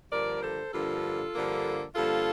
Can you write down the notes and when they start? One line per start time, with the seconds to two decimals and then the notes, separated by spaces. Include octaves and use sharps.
0.12 G2 D3 F3 A#3 A#4 D5
0.43 A4 C5
0.73 G2 D3 F3 A#3 F4 A4
1.35 G2 D3 F3 A#3
1.96 G2 D3 F3 A#3 F4 A4